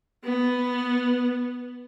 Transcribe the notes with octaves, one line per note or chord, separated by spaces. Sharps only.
B3